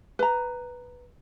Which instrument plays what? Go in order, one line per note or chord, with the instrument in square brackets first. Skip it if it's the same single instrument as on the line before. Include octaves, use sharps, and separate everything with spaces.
[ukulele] B4 A#5